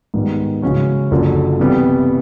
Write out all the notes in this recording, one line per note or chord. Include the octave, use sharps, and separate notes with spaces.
G#2 D#3 G3 B3
C#3 E3 G#3 C#4 F#4
F#1 F#2 D3 F3
C3 E3 G3 B3